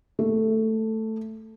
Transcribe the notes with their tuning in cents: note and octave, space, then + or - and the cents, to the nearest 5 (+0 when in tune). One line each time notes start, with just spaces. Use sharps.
A3 +5